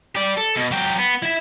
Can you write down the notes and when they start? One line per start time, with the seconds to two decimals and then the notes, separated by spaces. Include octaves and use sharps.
0.15 G4 D5
0.37 A4
0.56 B2
0.71 F#3 G4
0.99 B3
1.22 E4 E5